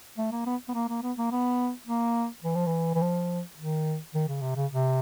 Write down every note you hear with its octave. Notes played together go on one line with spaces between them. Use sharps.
A3
A#3
B3
B3
A#3
A#3
B3
A#3
B3
A#3
E3
F3
E3
E3
F3
D#3
D#3
C#3
C3
C#3
C3